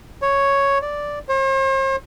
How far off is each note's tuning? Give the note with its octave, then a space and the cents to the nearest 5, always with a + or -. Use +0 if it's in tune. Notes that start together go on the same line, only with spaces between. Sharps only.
C#5 +0
D5 -5
C5 +45